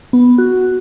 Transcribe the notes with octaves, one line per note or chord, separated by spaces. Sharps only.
B3
F#4